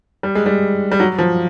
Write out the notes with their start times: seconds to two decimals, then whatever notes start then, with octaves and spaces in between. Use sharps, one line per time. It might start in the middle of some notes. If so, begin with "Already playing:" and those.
0.23 G3
0.35 G#3
0.46 G3
0.92 G3
1.00 F#3
1.18 F3